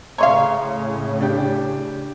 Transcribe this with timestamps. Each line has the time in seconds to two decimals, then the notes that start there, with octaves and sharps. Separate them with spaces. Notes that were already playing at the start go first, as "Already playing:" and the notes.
0.18 A2 C#3 C#5 D#5 F5 A#5 C6 C#6
1.21 D4 G4